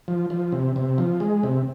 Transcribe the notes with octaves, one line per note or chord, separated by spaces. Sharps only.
F3
F3
C3
C3
F3
G#3
C3